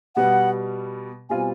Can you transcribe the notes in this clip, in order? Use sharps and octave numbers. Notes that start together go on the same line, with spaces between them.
B2 G3 B3 F#5
B2 G3 C4 F4 G#5